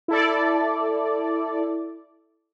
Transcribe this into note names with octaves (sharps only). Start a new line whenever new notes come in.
E4 A4 D5